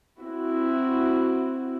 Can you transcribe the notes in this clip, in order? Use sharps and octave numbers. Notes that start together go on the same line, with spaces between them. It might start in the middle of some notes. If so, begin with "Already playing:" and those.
C4 E4 F#4